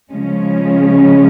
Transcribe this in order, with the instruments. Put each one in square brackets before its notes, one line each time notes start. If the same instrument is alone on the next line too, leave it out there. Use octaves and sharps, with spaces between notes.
[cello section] C#3 F3 G#3 C#4